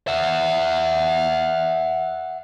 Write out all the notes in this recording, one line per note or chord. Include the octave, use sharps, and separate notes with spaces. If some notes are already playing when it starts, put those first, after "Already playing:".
E5 F#5